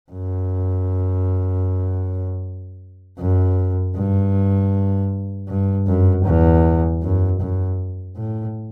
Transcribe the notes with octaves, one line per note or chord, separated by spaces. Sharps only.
F#2
F#2
G2
G2
F#2
E2
F#2
F#2
A2